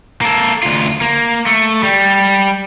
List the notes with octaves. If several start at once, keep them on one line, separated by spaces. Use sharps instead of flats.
A#3 A4
D2 F4
A#3
A3
G3